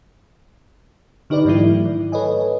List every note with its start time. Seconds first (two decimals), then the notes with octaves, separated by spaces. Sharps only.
1.30 D3 D#4 G4 B4 D5
1.45 G#2 E3 F#3 A3 E4
1.85 D#3
2.12 A4 B4 C#5 D#5 G#5